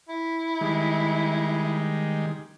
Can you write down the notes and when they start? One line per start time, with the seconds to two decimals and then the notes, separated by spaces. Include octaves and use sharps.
0.09 E4
0.61 D#3 G3 G#3